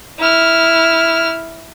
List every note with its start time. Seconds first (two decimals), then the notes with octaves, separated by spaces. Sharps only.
0.19 E4 F6